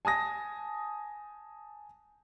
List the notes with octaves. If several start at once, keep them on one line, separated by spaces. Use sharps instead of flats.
G#5 A5 D#6 A#6